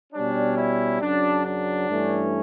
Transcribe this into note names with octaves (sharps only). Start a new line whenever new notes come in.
B2 G3 C#4 D4
E4
F#2 C#3 F#3 D4
D4
G2 E3 A3 C#4